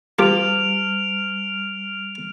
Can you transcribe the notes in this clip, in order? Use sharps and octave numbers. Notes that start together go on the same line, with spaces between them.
G3 F4 G4 F6 D7 F7